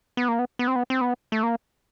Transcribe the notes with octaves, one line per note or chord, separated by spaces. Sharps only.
B3
A#3
B3
B3
C4
B3
C4
B3
A3
A#3